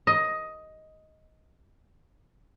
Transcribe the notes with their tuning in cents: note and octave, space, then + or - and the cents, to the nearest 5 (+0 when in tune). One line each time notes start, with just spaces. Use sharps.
D#5 +10